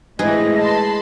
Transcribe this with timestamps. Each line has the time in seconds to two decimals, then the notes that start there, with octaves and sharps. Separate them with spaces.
0.19 A2 E3 G#3 C4 G#4 B4 D#5
0.59 A5 B5 C6